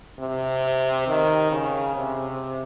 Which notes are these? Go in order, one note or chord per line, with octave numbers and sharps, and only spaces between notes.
C3
D#3
C#3
C3